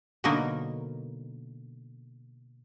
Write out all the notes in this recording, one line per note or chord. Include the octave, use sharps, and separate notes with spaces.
B2 D3 F#3 A#3 D#4 A#4